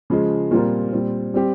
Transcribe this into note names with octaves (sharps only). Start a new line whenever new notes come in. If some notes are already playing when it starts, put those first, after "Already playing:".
C#3 F3 G#3
A#2 G3 C4 F4 A#4
A#2 G3 C4
G3 C4 G4